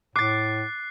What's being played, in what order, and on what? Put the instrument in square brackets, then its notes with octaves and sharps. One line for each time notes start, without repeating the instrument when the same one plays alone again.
[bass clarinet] A2 [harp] D6 A6 [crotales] F#6 C7